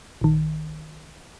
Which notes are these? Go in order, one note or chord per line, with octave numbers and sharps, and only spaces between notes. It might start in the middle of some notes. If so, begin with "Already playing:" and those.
A#1 D#3